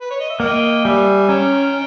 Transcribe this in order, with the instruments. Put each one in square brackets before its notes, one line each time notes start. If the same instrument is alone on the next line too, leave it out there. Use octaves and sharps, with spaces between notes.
[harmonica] B4
C#5
D#5
E5
[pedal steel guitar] A#3 [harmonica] D#5 G5
[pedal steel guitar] G3 [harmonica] E5 G#5
[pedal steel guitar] C#4 [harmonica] G5 A#5